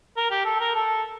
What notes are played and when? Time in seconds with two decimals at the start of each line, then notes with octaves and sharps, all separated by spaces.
0.17 A#4
0.31 G4
0.45 A4
0.61 A#4
0.75 A4